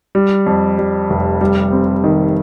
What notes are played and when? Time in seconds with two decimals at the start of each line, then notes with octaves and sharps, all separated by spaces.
0.15 G3
0.46 F2
0.78 G3
1.10 F1
1.41 G3
1.72 C4
2.04 D#3